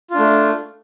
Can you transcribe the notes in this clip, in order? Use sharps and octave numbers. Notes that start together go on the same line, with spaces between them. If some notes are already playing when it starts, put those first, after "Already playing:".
A3 D4 F4